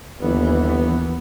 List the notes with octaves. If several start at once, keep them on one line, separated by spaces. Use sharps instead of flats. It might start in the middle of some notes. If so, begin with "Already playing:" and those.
G1 D#2 E3 B3